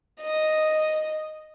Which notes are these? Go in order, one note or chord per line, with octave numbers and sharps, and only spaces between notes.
D#5